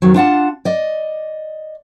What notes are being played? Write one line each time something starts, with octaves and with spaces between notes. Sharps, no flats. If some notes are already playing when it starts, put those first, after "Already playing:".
F2 D#3 F#3
D4 F4 F#5 A5
D5 D#5